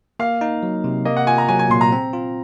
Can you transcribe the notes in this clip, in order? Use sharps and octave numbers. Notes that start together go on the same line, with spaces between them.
A#3 F5
D#4
F#3
C3
A#3 D#5
F#5
F4 G#5
A#5
F#3 G#5
G#5
A#2 C6
A#5
C4
F4